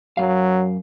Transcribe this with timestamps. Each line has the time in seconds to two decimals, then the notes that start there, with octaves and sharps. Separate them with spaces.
0.17 F#2 F#3 F5